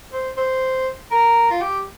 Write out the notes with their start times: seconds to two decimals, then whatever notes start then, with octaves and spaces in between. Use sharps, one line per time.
0.12 C5
0.37 C5
1.11 A#4
1.50 F4
1.61 G4